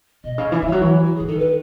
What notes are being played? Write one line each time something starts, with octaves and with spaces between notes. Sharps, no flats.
B2 D#5
C#3
E3 E5
E3 C#5
F#3
E3
F#4
E3 G#4
D#3 A4
B4